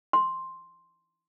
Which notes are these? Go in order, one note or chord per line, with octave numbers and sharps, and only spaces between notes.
C6